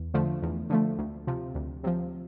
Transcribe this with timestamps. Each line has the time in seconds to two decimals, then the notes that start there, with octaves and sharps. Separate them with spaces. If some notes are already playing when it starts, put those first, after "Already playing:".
Already playing: E2
0.14 D3 F3 A3
0.42 E2
0.70 D3 F3 A3
0.98 D2
1.27 C3 F3
1.55 D2
1.84 C3 F3